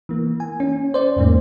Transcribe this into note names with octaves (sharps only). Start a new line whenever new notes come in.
E3 A#3
G#5
C#4
C5 D5
E2 G#2 A#3